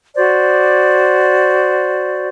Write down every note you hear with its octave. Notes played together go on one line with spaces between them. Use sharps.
F#4 C5 D5